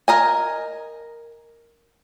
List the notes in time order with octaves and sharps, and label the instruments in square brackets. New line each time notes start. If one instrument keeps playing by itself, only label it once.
[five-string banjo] A#4 D#5 G#5